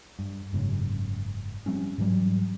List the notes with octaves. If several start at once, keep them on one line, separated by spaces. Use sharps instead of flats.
G2
F#1 G#2 C#3 F#3
F3 G3 C4 C#4
G#2 E3 F#3 G3